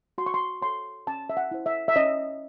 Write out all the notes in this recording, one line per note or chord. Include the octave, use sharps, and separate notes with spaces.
F#4 C6
C#6
C6
A4 C#5 C6
C#4 A5
E5
F#5
E4 C5
E5
E5
C#4 D#5